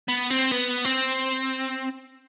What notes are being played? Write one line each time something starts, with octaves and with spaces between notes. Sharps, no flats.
B3
C4
B3
C4